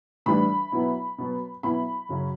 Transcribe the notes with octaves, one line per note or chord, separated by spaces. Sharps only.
A2 E3 G3 D4 B5
B2 F#3 B3 E4
B2 F#3 B3
B2 F#3 B3 E4 B5
F#2 C#3 F#3 C#4